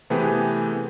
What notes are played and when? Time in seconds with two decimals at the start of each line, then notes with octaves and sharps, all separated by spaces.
0.10 C3 E3 A3 B3 G4 G#4